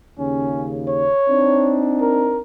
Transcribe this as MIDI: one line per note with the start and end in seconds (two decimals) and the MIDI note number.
0.19 1.12 39
0.19 1.12 49
0.19 0.69 61
0.88 1.84 73
1.30 2.42 60
1.30 2.42 62
1.30 2.42 63
2.01 2.42 70